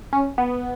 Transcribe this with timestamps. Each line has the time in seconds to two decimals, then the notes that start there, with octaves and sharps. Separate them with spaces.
0.13 C#4
0.38 B3